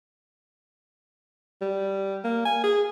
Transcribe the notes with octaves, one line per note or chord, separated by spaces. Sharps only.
G3
A#3
G#5
G#4